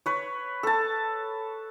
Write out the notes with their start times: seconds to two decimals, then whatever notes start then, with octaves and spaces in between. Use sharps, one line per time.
0.06 B4 C#5
0.63 A4 A5